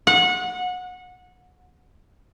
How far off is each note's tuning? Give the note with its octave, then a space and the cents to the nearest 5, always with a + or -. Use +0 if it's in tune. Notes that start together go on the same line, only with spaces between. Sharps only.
F#5 -25